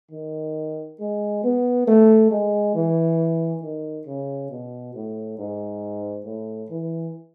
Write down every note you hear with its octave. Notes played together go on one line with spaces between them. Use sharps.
D#3
G#3
B3
A3
G#3
E3
D#3
C#3
B2
A2
G#2
A2
E3